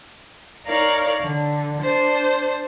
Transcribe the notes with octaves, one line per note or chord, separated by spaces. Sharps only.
D#4 A#4 C#5 D5 F5
D3
D4 C5